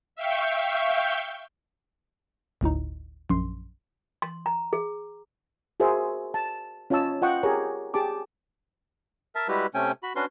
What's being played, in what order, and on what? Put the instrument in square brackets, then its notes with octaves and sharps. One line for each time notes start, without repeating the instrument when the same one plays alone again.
[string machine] E5 F5 G5 C#6 G6
[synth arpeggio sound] G1 D2 A2 D#4
A#1 F#2 C6
[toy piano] C6
A#5
G#4
[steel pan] F#4 G#4 A#4 C5 E5
A5
C#4 F4 C#5 D#5 A5 E6
F4 D#5 F#5 G5 C#6
G4 G#4 A#4 C#5 A#5
G4 G#4 A5 D6
[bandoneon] A#4 E5 A5
G3 G#3 E4 F#4 G4 B4
C3 A3 C#4 G5 G#5
F#4 B5
C#4 D4 F#4 B4 C6